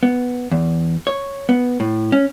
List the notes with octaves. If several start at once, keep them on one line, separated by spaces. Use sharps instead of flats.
B3
E2
C#5
B3
A2
C#4